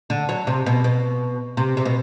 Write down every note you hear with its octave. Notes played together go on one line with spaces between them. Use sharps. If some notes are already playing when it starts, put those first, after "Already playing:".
D3
F#3
C3
B2
B2
C3
C3
B2